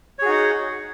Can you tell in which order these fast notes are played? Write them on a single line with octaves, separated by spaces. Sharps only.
C#5 G#4 F#4 D#4 F#5